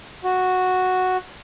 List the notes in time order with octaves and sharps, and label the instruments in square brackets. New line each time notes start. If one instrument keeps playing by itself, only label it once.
[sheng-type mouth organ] F#4